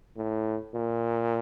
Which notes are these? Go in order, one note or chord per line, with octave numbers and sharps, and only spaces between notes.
A2
A#2